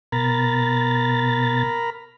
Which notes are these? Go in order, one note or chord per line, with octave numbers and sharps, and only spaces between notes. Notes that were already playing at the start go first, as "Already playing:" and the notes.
B2 A#4 A#5 B5 A6